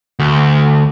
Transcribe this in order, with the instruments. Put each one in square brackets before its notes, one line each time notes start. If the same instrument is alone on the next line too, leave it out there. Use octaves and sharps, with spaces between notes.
[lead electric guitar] D2